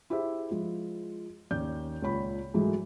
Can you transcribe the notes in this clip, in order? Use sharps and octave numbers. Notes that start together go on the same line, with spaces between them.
E4 G4 G#4 C5 E5
F3 G#3
D#2 C#4 D5 G6
C#2 A#2 C#5 B5
G#2 E3 F#3 G#3 A3